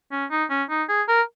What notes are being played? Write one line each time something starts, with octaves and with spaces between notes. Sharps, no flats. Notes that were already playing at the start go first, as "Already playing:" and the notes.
C#4
D#4
C#4
D#4
G#4
A#4